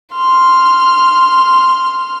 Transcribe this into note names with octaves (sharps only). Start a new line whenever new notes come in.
C6 F6